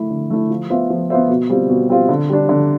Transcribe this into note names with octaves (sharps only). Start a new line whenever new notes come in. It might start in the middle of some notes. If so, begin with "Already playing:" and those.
Already playing: A3 E4
D3
A3 E4
F3
B3 F4 C5 E5
F3
B3 F4 C5 E5
B2
G3 C4 F4
B2
G3 C4 F4
D3
G3 D4
D3